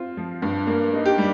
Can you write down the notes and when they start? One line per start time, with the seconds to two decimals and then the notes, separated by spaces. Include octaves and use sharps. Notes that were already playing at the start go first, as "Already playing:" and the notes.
Already playing: C4 F4
0.17 F3
0.42 G2
0.67 A#3
0.93 D#4
1.06 G4
1.18 G3